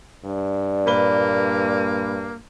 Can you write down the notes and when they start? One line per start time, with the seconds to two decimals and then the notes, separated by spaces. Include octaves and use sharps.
0.25 G2 D5
0.86 A#2 A#3 B4 G7